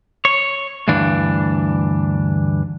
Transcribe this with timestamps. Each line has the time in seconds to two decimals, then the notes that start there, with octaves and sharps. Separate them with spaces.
0.25 C#5
0.88 D2 G2 E3 D4